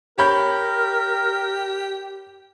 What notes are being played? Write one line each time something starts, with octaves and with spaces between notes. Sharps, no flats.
G4 A#4 C#5 B5 G6